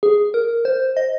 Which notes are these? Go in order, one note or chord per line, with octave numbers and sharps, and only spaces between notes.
G#4
A#4
C5
D#5